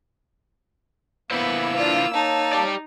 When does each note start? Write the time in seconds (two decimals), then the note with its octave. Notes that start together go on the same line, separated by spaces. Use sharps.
1.31 A#3 B3 E4 B4 C5 E6
1.77 D4 F4
2.14 D#4 C#5 A5
2.53 G4 D5